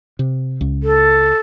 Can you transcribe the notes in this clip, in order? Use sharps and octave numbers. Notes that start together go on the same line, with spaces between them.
C3
C#2
A4